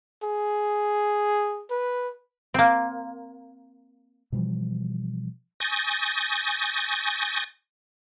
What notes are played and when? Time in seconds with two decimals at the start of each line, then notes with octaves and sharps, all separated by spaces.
0.23 G#4
1.71 B4
2.54 A#3 C4
4.32 B2 E3 F3 G3
5.60 G#5 C#6 D#6 G6 A6 A#6